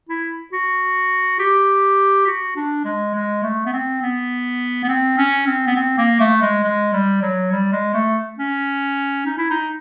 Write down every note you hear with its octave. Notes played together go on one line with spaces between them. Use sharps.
E4
F#4
G4
F#4
D4
G#3
G#3
A3
B3
C4
B3
B3
C4
C#4
C4
B3
C4
A#3
A3
G#3
G#3
G3
F#3
G3
G#3
A3
C#4
D#4
E4
D#4